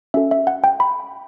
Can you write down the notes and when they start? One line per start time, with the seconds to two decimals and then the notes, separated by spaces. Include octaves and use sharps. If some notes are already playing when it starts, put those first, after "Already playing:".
0.14 C#4 F#4 A4 E5
0.31 E5
0.47 F#5
0.64 G5
0.80 B5